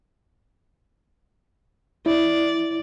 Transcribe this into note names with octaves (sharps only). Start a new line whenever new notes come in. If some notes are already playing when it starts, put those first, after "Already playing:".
E4 D5